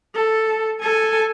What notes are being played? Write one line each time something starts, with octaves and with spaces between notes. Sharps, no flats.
A4
A4 G#5